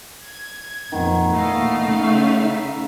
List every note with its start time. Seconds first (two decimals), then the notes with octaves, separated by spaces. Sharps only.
0.22 G#6
0.92 F2 A#2 D#3 B3
1.34 E2 A#2 A3 D#5 F5
1.84 C#3 D#4 E5